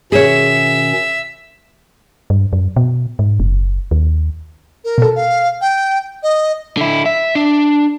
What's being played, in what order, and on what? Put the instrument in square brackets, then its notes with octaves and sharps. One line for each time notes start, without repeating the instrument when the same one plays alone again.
[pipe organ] B2 D#3 C#4 [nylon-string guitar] G#4 C#5 [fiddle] E5
[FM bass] G2
F#2
B2
G#2
F#1
D#2
[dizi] A#4
[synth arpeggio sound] B2 A4
[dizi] F5
G5
D#5
[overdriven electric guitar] D3 E4
E5
D4